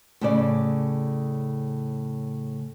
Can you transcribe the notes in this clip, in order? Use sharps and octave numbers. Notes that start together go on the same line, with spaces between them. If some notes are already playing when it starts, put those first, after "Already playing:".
A2 C#3 D5